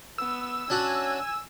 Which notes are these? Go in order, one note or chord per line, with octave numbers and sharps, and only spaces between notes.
B3 E6
C#4 D4 F#4 G#5